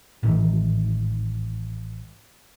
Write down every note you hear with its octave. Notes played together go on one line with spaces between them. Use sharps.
A1 G#2 D#3 E3